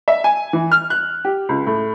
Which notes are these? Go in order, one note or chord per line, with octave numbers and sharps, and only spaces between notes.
E5
G#5
E3
F6
F#6
G4
C#2
A2